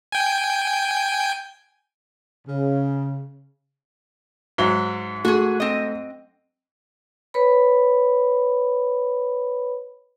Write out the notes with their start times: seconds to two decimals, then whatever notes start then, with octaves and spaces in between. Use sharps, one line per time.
0.12 G5 G#5
2.47 C#3
4.58 G#2 F#3 D#4 E5 G7
5.25 A3 F#4 G#4
5.60 C4 D#5
7.34 B4 C#5 B5